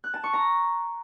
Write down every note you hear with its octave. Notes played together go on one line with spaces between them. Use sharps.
F#6
A5
C#6
A#5